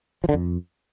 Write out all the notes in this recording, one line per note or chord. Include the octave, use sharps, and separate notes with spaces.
F3
D3
F2